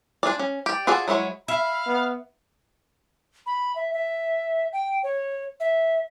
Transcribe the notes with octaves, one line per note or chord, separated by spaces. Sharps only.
D4 F4 G#4 D5
C#4
G4 D5
F4 F#4 G#4 A4 D5
F#3 G#3 E4 C#5
E5 F5 B5
B3
B5
E5
E5
G5
C#5
E5